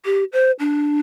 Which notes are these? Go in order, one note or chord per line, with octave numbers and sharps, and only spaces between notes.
G4
C5
D4